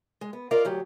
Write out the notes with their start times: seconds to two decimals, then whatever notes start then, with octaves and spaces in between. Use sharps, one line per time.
0.21 G#3
0.33 B3
0.51 F4 A#4 D5 D#5 F5
0.65 D2 F#3 G4